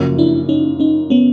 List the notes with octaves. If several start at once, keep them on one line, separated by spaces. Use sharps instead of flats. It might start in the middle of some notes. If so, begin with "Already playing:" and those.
Already playing: F#2 C#3 F3 A#3
D4 E4
C#4 D#4
C#4 D#4
B3 C#4